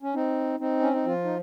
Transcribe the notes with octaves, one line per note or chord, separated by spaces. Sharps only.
C#4
C4 D#4
C4 D#4
C#4
D#4
F3 F4
D#4